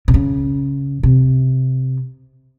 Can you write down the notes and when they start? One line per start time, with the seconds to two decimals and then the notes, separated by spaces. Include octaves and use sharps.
0.08 C3
0.14 C#3
1.03 C3